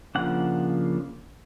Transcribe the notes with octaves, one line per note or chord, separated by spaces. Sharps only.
C#3 F3 A#3 D4 F#5